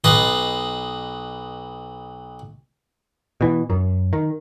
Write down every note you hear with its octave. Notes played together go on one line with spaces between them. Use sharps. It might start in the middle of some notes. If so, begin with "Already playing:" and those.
B1 B4 D#5 A5 C6
B2 E3
F#2
D#3